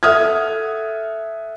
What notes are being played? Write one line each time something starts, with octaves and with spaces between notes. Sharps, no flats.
A4 E5 F#5 D#6 F6 G#6